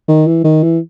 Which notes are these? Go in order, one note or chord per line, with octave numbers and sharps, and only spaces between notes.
D#3
E3
D#3
E3